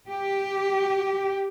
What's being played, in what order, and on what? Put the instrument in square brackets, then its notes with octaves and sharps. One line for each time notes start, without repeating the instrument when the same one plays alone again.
[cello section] G4